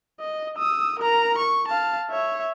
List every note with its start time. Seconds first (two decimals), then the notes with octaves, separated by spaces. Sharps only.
0.20 D#5
0.58 D#6 E6
0.99 A#4 A#5
1.38 C#6
1.68 F5 A5
2.10 C#5 E5